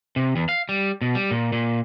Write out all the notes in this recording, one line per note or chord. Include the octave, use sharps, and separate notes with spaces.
C3
E2
F5
G3
B2
G3
A#2
A#2